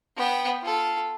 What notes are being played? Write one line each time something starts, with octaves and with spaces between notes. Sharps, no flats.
B3 G5
F4 A4